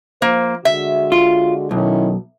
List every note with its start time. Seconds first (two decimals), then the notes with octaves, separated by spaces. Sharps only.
0.22 F3 A#3 F4 C5
0.65 D3 G#3 F#4 E5
1.12 F4
1.71 B1 D#3 C#4 E4